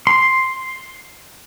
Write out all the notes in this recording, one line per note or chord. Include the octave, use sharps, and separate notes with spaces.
C6